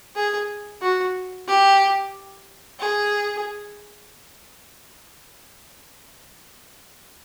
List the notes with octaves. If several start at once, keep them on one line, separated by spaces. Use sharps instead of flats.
G#4
F#4
G4
G#4